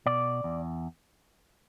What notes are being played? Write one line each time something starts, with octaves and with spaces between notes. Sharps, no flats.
B2 D5
E2